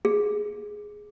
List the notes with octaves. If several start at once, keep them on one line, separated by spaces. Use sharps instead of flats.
G#4